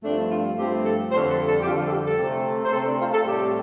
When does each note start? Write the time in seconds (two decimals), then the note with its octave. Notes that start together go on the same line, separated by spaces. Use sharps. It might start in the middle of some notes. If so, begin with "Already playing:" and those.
0.03 G2 F3 A3 C4 D4
0.30 F4
0.57 G2 F3 A3 C4 G4
0.84 A4
1.11 F2 D3 G3 C5
1.29 A4
1.47 A4
1.60 G4
1.65 F2 D3 G3 F4
1.77 F4
1.87 A4
1.91 G4
2.05 A4
2.18 C3 A3 C4
2.65 C5
2.72 C3 A3 C4 A4
2.85 D4
2.99 F4
3.12 A4
3.26 A2 G3 C4 G4